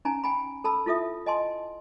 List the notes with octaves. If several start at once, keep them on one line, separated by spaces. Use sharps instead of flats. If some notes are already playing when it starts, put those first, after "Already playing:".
C#4 D#4 G#5 A#5
G5 G#5 B5
A4 A5 B5 E6
E4 F4 A4 E5 D#6
D#5 G#5 A5 C6